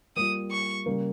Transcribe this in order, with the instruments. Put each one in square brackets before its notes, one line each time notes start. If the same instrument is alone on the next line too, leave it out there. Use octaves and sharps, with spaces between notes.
[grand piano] G3 A#3 F4 [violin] D#6
[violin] C#6
[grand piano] C#3 G3 A#3